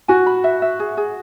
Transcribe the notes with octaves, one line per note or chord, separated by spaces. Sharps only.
F#4 G#5
B5
E5
E5
G#4
G#4